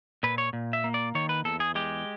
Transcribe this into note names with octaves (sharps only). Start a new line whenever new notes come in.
A#2 B4
C#5
A#2
E5
A#3
D5
D#3 C#5
B4
E2 A4
G#4
G#3 G4